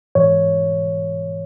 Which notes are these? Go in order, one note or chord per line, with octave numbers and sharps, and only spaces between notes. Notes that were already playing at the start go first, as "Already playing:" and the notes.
G#2 E3 C#5